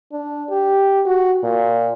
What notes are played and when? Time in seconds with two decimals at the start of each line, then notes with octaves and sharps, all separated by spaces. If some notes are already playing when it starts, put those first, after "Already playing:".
0.12 D4
0.50 G4
1.06 F#4
1.43 A#2